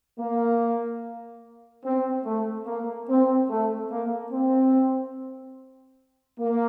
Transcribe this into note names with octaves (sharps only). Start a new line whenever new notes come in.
A#3
C4
A3
A#3
C4
A3
A#3
C4
A#3